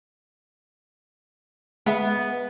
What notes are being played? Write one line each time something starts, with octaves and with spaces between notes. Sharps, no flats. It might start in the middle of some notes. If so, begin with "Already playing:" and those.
G#3 B3 G#4 E5